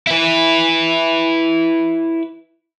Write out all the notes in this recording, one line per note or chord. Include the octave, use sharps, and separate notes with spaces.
E4 B4